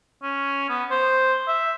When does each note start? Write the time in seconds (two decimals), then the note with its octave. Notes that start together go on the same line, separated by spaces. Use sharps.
0.23 C#4
0.70 B3
0.91 C5
1.47 E5